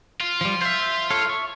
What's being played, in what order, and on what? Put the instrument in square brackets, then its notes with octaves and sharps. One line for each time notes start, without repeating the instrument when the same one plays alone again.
[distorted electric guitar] F4
[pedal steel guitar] F3 G3
[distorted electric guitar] F4 [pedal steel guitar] C5 E5
[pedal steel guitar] A4 C#5 F5
E5 C#6